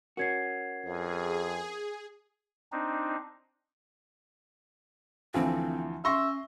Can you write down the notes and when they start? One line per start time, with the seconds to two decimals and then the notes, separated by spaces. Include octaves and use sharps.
0.17 C#4 F#4 A#4 G#6 C7
0.85 F2 G#4
2.72 C4 D4 D#4
5.34 D2 E3 F3 C4
6.05 C#4 E5 C6 C#6 A#6